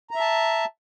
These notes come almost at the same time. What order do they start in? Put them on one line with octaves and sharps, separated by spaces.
A#5 E5 A5